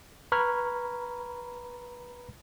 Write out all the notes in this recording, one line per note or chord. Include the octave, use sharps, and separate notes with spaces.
B4 A#5 B5 C#6 F6 G#6